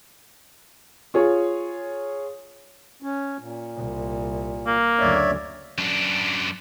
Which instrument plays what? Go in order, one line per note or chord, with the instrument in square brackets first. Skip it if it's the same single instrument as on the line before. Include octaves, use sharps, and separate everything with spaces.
[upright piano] F4 G#4 C#5
[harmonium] C#4
A#2
[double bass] C2
[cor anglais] A#3
[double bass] F#1 D2 [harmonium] C#5 D5 E5
[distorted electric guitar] F#2 D4